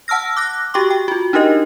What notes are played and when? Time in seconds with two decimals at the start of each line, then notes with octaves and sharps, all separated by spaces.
0.08 F#5 A5 E6 F6 A#6
0.37 D6 F#6 A#6
0.74 F#4 G4 G5 C#6 D6
0.90 G5
1.08 F4 F#4
1.33 D4 D#4 G4 A#4 D#5